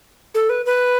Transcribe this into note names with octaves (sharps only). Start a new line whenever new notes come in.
A4
B4
B4